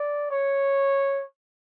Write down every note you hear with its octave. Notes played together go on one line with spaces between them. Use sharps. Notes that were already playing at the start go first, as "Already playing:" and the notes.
Already playing: D5
C#5